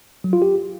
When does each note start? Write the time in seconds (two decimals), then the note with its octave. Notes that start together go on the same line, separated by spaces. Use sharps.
0.24 F#3
0.33 F4
0.42 G4